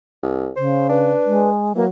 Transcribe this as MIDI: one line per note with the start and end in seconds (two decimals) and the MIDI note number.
0.23 0.50 36
0.56 1.13 49
0.56 0.89 72
0.89 1.49 62
0.89 1.50 71
1.26 1.73 56
1.75 1.85 52
1.75 1.88 54
1.75 1.85 58